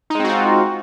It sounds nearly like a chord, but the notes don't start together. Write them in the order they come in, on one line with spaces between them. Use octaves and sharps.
D#4 G#3 C4 F#4 F4